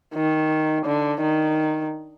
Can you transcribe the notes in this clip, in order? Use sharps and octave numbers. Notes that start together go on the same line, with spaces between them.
D#3
D3
D#3